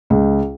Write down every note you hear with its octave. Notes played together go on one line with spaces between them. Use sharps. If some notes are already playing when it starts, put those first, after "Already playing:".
C#2